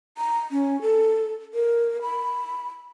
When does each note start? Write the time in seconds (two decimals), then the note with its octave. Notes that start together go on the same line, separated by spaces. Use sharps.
0.18 A#5
0.51 C#4
0.82 A4
1.54 A#4
2.02 B5